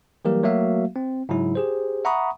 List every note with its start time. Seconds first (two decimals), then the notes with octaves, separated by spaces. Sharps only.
0.25 E3 F#3 G3 A#3 G4 A#4
0.43 F#3 A3 A#3 F#4 E5 F5
0.96 C4
1.29 G#2 C#3 F#3 E4
1.55 G4 G#4 C5
2.05 E5 F#5 A#5 B5 C#6 D#6